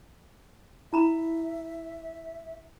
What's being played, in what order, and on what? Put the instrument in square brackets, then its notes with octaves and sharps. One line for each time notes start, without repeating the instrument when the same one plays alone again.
[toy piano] E4 A#5 B5 [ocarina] E5